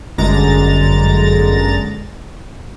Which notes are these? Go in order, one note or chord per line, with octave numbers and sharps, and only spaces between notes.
G1 F#2 D3 G#3 A#5 A6